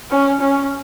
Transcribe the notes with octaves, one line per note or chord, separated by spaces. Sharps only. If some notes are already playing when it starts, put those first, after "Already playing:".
C#4
C#4